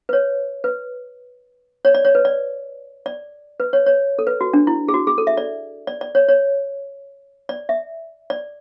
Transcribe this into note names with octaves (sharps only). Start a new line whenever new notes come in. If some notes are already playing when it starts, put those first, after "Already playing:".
B4
C#5
B4
C#5
D5
C#5
B4
D5
D5
B4
C#5
C#5
A4
B4
F#4
D4
E4
G#4
F#4
G#4
A4
E5
D5
D5
D5
C#5
C#5
D5
E5
D5